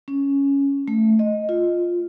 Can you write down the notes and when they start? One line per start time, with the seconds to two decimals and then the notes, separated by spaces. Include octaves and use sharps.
0.08 C#4
0.88 A3
1.19 D#5
1.49 F4